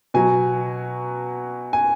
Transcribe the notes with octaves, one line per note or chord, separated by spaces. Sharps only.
B2 F#3 G#5
G#5